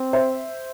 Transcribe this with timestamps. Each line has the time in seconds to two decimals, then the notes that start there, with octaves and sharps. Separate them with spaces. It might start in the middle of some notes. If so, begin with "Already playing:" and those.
Already playing: C4
0.13 C5 E5